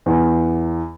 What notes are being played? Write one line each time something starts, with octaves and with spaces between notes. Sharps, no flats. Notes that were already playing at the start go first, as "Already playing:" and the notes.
E2